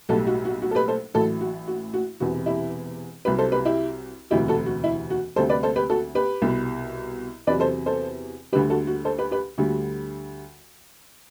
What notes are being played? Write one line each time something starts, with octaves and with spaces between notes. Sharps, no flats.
B1 A2 G3 F#4 A4
F#4
F#4
F#4
A4
G4 B4
A4 C5
A1 A2 F#3 F#4 A4
F#4
F#4
F#4
E1 E2 C3 F#4
E4 G4
C2 C3 F#3 G4 B4
A4 C5
G4 B4
E4 G4
E1 D2 C3 F#3 E4 G4
F#4 A4
F#4
E4
F#4
D2 C3 G3 A4 C5
B4 D5
A4 C5
G4 B4
F#4 A4
G4 B4
C2 B2 G3
E2 C3 F#3 B4 D5
A4 C5
A4 C5
D2 D3 G3 G4 B4
F#4 A4
F#4
A4 C5
G4 B4
G4 B4
D2 D3 G3 F#4